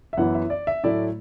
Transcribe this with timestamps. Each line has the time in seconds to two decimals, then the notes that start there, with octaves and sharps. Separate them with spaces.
0.13 E5
0.17 F#2 E3 B3 E4 F#5
0.34 E5
0.50 D5
0.67 E5
0.84 A2 F#3 A3 E4 D5